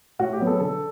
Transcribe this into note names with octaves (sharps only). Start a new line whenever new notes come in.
A2 F#4
G4
F#3 B3
A4
D3 A4